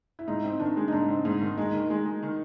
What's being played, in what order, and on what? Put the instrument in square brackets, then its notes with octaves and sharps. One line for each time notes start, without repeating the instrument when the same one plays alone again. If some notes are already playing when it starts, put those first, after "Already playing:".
[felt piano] E4
[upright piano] G#2 [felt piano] D#4
[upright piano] C4
[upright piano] D#3 [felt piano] D4
[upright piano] G#3
[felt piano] D#4
[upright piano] G#2 [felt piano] D4
[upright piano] C4
G#2
D#3
[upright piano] G#3 [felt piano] D#4
[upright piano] D#3
G#3
G#3
D#3